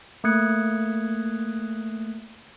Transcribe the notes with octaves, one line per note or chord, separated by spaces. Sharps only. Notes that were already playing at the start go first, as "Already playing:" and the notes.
A3 A#3 D#6 F#6 G#6 C#7